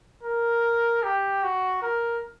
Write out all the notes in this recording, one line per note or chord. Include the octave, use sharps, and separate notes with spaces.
A#4
G4
F#4
A#4